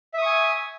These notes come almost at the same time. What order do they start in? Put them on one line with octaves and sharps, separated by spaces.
E5 D#6 C#6 G#5